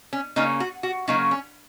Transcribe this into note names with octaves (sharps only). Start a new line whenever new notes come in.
C#4
C#3 A#3 C#4 D#4
F#4
F#4
C#3 F#3 A#3 C#4 D#4
C#4